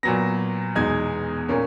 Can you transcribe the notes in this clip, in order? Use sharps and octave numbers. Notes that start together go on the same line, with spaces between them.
A#2 F#3 B3 A#6
E2 B2 G#3 D#4 G#6
A#2 A#3 C#4